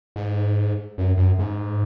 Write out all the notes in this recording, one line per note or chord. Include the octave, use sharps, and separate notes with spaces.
G#2
F#2
F#2
G#2